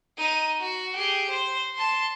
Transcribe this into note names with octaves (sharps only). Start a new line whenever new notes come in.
D#4 D#7
F#4
G4 G#4
C5
A5 C6